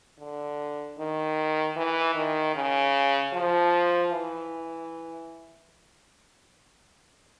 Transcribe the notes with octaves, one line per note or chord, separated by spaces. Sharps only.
D3
D#3
E3
D#3
C#3
F3
E3